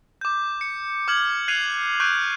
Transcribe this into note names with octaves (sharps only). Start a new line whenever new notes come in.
D6 G6
C#7
D6 F6 G#6 F#7
F#6 G#6 C7 D#7 F7
C#6 F#6 G6 D7